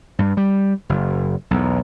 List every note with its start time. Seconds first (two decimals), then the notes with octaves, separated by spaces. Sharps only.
0.19 G2
0.37 G3
0.89 F#1
1.51 B1 E2